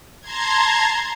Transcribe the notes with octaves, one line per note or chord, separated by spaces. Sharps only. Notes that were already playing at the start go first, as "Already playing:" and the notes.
A5 A#5 C6 G#6